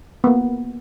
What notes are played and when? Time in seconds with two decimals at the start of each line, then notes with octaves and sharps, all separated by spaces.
0.24 A#3 B3